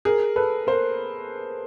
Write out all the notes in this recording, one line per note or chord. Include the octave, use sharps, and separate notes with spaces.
G#4 A#4
A4 B4
A#4 C5